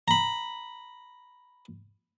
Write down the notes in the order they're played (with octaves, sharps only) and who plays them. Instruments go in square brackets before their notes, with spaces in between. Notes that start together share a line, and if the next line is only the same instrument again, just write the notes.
[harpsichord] A#5 B5